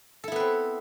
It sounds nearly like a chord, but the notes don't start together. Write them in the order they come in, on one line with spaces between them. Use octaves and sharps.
A4 E4 B3 B4 C4